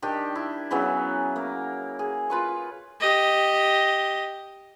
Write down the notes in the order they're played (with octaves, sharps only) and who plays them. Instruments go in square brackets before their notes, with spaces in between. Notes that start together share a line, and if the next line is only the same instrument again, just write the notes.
[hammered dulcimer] D#3 D4 D#4 G4
E4
C#3 E3 F#3 B3
A#3
G#4
F4 B4 C#6
[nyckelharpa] G4 D#5